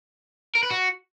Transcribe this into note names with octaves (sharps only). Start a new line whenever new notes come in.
A#4
B4
F#4